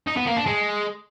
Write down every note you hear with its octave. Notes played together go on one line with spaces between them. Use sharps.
D#4
B3
A#3
D4
G#3